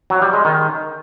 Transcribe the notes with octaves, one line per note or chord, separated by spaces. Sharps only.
F#3
G3
G#3
D#3